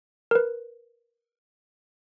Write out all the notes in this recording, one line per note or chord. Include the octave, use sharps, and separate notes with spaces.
A#4 B4